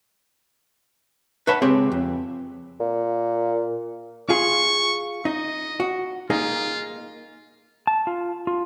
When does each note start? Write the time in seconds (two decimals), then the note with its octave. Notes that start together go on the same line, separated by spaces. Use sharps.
1.47 B4 C#5 E5 F#5 A5 B5
1.62 C#2 C4 G4 G#4 C#5
1.92 F2
2.80 A#2
4.29 F4 G#4 C#6
5.25 D#4 D#5
5.80 F#4
6.30 A#3 D#4 F4 G#4
7.87 A5
8.07 F4
8.47 F4